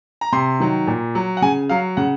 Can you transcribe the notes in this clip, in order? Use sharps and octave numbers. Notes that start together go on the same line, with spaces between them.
A#5
C3 C6
D#3 F#3
A#2
F#3
F#5
C#3 G#5
F#3 F5
C#3 F#5